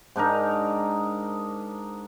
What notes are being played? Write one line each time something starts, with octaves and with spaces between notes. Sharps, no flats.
G#2 D4 D#4 A#4